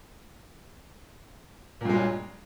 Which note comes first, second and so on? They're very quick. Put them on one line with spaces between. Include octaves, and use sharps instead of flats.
A#2 G2 G#3 F#3